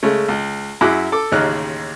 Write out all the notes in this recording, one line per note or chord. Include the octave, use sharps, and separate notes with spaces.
C#3 G#3 A3
C#2
F#2 E4 F#4 G#4 D6 F#6
A4 D6
A1 D#2 C#3 D#4 F6 F#6